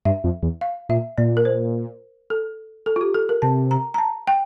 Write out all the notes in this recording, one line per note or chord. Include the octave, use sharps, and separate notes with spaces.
G2 E5
F2
E2
F5
A#2 E5
A#2 D5
A#4
C5
A4
A4
F4
G4
A4
A#4
C3 A5
A#5
A#5
A5
G5